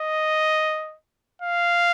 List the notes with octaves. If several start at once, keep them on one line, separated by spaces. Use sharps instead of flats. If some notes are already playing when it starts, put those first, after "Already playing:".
Already playing: D#5
F5